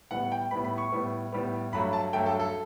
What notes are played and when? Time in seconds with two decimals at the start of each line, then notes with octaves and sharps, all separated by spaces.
0.11 A2 G3 B3 F#5
0.32 G5
0.51 A2 G3 B3 B5
0.65 B5
0.78 C#6
0.92 A2 G3 B3
1.32 A2 G3 B3
1.72 G2 F#3 A3 B5
1.93 A5
2.13 G2 F#3 A3 G5
2.26 A4
2.40 A4